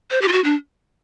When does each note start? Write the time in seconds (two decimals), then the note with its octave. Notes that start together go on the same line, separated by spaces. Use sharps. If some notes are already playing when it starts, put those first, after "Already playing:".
0.11 C5
0.22 G4
0.28 F4
0.32 F#4
0.44 D4